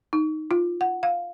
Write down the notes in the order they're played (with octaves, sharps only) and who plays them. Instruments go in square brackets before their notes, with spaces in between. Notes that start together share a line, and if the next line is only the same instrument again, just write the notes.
[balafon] D#4
F4
F#5
F5